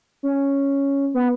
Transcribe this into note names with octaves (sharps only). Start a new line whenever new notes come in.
C#4
B3